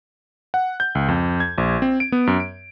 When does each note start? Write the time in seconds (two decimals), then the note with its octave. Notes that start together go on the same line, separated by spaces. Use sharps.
0.54 F#5
0.80 G6
0.95 C#2
1.08 F2
1.40 G#6
1.58 A#1
1.82 C4
2.00 D7
2.12 B3
2.27 F#2
2.40 D7